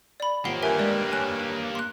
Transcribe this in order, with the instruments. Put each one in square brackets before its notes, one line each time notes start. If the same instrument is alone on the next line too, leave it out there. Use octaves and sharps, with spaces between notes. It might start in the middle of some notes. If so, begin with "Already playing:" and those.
[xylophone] D5 B5
[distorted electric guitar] A#3 G4 [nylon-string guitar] F4 C5 C#5 [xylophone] F#5 C7 G7
[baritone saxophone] G2 [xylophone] A#4 E5 G#5
[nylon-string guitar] G#3 [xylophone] D5
[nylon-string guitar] C#5 [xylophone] G#5 F#6
[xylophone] C6 F#6